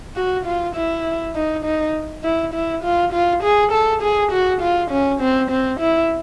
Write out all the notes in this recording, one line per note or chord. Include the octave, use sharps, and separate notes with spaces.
F#4
F4
E4
D#4
D#4
E4
E4
F4
F4
G#4
A4
G#4
F#4
F4
C#4
C4
C4
E4